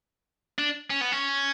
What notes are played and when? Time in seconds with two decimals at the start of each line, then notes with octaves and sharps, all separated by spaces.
0.59 D4
0.90 C#4
1.01 B3
1.12 C#4